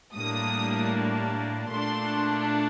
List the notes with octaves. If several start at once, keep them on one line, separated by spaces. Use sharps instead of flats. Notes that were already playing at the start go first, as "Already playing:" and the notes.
A2 G3 A#3 D4 D#6
A#2 A3 D4 C6